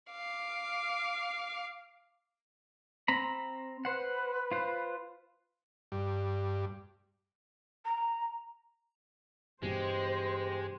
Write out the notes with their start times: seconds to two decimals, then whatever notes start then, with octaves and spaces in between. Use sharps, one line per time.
0.11 F5 D6
3.08 C4 A#5 B5
3.85 B4 C5 F#5
4.51 F4 C5
5.92 G2
7.85 A#5
9.62 G2 B2 E3 G#3 G4 C5